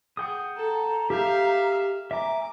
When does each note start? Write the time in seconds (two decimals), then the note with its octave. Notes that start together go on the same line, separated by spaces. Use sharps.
0.17 G#4 F#5 G5 D#6
0.57 A4 A#5
1.10 G4 E5 F5 G6
2.11 E5 G#5 A#5 D6